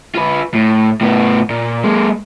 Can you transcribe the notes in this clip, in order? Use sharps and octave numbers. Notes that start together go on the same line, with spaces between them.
F4 B4
A2
A2 B3
A#2
G#3 A#3